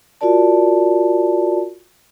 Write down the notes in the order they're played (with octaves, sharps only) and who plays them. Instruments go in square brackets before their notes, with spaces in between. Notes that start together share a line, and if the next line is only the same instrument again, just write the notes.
[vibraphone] F4 F#4 A#4 D5 A5